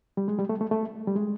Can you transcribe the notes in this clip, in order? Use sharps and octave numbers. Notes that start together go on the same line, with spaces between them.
G3
G#3
G3
A3
A3
A3
G3
G#3